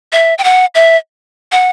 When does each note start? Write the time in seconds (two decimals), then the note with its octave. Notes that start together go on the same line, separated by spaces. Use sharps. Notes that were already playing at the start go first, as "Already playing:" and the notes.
0.12 E5
0.38 G5
0.44 F#5
0.75 E5
1.52 F#5